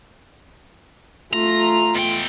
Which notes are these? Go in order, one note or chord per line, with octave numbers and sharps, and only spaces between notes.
A3 F4 A#5
B2 G5